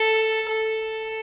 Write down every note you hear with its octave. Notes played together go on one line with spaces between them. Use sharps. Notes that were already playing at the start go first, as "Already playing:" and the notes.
Already playing: A4
A4